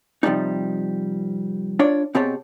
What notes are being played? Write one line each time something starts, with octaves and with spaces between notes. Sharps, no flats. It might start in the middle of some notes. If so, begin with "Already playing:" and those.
C3 F3 G3 G#3 D4 D#4
D4 F4 C#5 D5
B2 C4 G4 G#4 C#5 A5